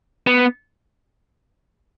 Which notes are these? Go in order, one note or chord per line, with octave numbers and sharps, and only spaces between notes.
B3